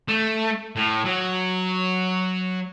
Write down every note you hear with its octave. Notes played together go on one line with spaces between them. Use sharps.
A3
A2
F#3